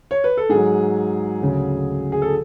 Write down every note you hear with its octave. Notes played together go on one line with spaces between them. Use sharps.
C#5
B4
A4
G#2 F#3 G#4
D2 C#3 F#3
G#4
A4